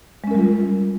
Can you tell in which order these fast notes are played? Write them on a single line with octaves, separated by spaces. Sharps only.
G#3 C#4 A#4 G3 F4